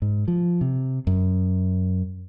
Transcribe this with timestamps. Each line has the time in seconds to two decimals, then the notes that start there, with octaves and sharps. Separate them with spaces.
0.02 G#2
0.28 F3
0.61 C3
1.07 F#2